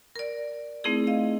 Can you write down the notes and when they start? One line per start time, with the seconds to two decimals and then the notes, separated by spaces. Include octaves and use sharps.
0.16 A#4 D5
0.84 A3 C4 D#4 E4 G#4
1.07 D#5 F5